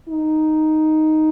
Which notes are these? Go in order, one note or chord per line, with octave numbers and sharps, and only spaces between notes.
D#4